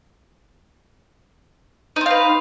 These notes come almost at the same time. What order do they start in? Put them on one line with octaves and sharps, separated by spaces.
D#4 C4 F5 B4